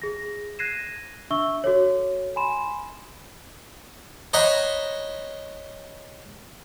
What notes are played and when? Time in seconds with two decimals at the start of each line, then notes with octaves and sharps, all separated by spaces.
0.02 G#4 A#6
0.59 F#6 G#6 A#6 C7 D#7 E7
1.30 D4 E5 C#6 E6 G7
1.64 F#4 A4 C#5
2.36 G#5 B5 C6 E7
4.33 C5 C#5 D#5 F#5 A#5 B5